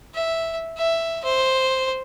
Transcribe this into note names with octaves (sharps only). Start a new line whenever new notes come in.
E5
E5
C5